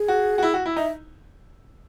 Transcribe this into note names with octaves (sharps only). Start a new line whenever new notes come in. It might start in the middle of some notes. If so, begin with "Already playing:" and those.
Already playing: G#4
F#4
F#4
E4
F#4
E4
D#4 E5